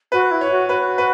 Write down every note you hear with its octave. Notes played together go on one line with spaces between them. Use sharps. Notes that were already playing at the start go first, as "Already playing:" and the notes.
F#4 B4
E4
C#5
F#4
F#4 B4
B4